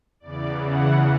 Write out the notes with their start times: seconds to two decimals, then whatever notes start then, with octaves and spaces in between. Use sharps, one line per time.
0.20 E2 C#3 E3 D5
0.62 F#5